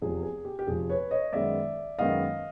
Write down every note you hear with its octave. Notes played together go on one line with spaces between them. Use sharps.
F1 E2 C3 F3 G#4
G#4
G4
G4
F1 E2 C3 F3 G#4
B4 C#5
C#5 D#5
F#2 D#3 G#3 B3 D5 E5
F#2 D#3 G#3 B3 D#5 F5